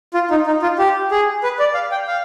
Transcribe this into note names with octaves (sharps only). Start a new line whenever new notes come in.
F4
D#4
D#4
F4
G4
G#4
B4
D5
F5
G5
F5